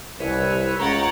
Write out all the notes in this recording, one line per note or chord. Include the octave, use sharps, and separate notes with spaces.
C2 E4 B4 C#5
C#2 C#5 F#5 G5 A#5 A6